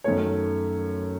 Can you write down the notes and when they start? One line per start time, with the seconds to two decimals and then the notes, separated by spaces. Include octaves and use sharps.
0.04 F#2 D#3 A3 C#5